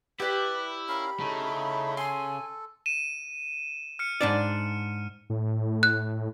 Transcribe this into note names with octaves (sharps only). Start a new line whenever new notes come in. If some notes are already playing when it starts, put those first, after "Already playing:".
E4 G4 B4 D5
C#4 A#4 F5 B5
C#3 A3 D#4 E4
A4 G#5 C6
D#7 E7
F6 C#7
G#2 D4 D5
A2
F#6